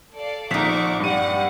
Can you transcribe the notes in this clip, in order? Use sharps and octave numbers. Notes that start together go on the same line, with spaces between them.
A4 D5 F5
A#1 C4 D#4 F#5 C#6 D6 B6
G2 G3 F#5 D#7